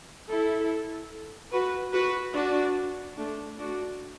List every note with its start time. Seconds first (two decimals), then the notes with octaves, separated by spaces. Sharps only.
0.29 E4 A4
1.52 F#4 B4
1.93 F#4 B4
2.34 D4 F#4
3.17 A3 D4
3.58 D4 F#4